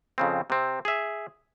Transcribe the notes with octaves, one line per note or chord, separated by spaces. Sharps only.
F2 C#3 C4
C3 C4
G#4 E5